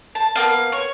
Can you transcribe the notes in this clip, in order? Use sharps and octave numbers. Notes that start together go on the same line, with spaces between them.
A5
A#3 B3 F5
C#5